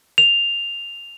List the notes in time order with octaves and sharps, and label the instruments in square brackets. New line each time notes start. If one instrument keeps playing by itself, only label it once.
[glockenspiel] F7